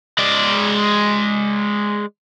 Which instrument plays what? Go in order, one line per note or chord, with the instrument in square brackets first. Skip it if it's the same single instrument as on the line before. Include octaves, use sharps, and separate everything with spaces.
[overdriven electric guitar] G#3 D5